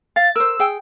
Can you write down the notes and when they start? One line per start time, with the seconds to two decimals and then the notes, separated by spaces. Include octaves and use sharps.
0.16 F5 A6
0.36 A#4 C5 E6
0.60 G#4 G5